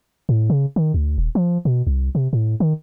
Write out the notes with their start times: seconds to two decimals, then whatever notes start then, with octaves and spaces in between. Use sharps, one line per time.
0.29 A2
0.50 C#3
0.76 D#3
0.94 D2
1.18 D#1
1.35 F3
1.65 B2
1.87 C2
2.15 C3
2.33 A2
2.60 D#3